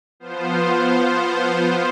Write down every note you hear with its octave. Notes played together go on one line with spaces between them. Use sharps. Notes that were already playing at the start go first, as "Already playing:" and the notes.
F3 B3 F4 C5